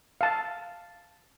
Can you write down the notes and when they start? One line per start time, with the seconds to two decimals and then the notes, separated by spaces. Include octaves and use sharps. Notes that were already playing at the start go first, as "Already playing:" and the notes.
0.21 F5 A5